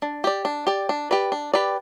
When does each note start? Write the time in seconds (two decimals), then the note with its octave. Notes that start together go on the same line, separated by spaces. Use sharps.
0.02 D4
0.24 G4 D5
0.45 D4
0.67 G4 D5
0.89 D4
1.11 G4 B4 D5
1.32 D4
1.54 G4 B4 D5